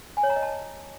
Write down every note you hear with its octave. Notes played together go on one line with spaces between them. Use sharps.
G#5
C#5
A#5
D#5
A5